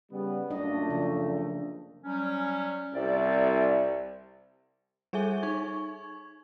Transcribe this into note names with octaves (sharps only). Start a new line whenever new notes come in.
C#3 G3 B3
F#2 A#2 A3 D4 D#5
C#3 F3
F#3 G3 C#4
C2 D5 E5
G3 G#4 A4 E5 G#5 G7
D#4 C#6 G#6